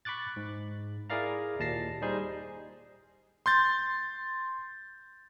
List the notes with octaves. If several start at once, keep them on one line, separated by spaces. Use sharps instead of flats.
B5 C#6 D6 F#6 A6
G#2
E4 G#4 A#4 D5 F5 A#5
D#2 A#2 A5 A#6 C7
G3 D#4 G#4 C5
C6 G6 A6